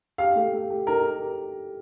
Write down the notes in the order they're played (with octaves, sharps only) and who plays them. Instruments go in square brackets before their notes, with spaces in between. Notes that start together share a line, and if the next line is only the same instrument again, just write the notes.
[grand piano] G4 [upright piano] F5
[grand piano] A3
A3
G4
[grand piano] D#4 [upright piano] A#4
[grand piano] G4
G4